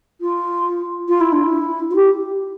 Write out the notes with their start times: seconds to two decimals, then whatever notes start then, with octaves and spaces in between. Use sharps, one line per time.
0.21 F4
1.08 F4
1.20 E4
1.32 D4
1.43 E4
1.90 F4
1.95 G4